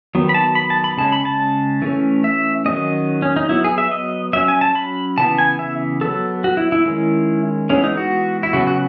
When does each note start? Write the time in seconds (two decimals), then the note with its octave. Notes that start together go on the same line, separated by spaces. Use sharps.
0.15 D#3 F#3 B3
0.29 B5
0.34 A5
0.55 B5
0.70 A5
0.84 B5
0.97 C#3 G#3 C#4 A5
1.12 B5
1.25 A5
1.82 E3 A3 C#4
2.24 E5
2.65 D#3 F#3 A3 C#4 D#5
3.22 C#4
3.36 D#4
3.49 F#3 B3 E4
3.64 G#4
3.78 E5
3.91 D#5
4.33 F#3 C#4 E5
4.48 G#5
4.61 A5
4.75 B5
5.18 C#3 E3 B3 A5
5.38 G#5
5.59 E5
6.01 F#3 B3 A4
6.44 F#4
6.57 E4
6.72 E4
6.85 D#3 G#3 C#4
7.70 E3 G#3 B3 C#4
7.84 D#4
7.97 F#4
8.43 E4
8.53 C#3 F#3 B3 F#4
8.67 F#4